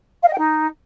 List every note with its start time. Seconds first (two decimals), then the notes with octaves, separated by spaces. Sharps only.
0.23 F5
0.28 D#5
0.33 G5
0.38 D#4